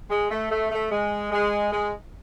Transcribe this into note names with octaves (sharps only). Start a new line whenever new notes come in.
G#3
A3
A3
A3
G#3
G#3
G#3